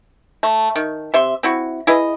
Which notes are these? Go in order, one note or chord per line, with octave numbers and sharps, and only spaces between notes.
A3
D#3
C3 E5 C6
C4 E4 F#4
E4 G#4 B4 D#5